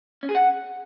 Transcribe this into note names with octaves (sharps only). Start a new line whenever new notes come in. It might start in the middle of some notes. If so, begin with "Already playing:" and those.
C#4
G#4
F#5